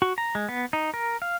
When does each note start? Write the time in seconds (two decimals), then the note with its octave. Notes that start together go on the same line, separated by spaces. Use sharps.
0.02 F#4
0.18 A#5
0.35 G#3
0.49 B3
0.73 D#4
0.94 A#4
1.22 F5